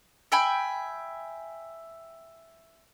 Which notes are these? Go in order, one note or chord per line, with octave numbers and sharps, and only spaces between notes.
E5 G5 G#5 B5